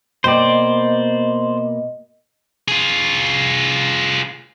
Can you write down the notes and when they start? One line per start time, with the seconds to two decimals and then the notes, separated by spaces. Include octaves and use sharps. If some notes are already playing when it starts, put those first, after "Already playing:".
0.24 B2 A#3 C5 D5 D#5 G5
2.68 F4 G#4